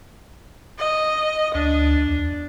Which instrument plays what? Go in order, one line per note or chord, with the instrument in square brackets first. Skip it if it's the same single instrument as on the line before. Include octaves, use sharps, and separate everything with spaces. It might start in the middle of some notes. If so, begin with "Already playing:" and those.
[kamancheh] D#5
[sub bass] D2 [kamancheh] D4
[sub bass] E2